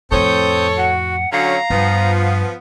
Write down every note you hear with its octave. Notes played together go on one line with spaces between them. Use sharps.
F2 A2 C4 A4 C#5 D#6 G6
F#4 F#5
D3 F#3 C#4 F5 A#5
G2 F3 B3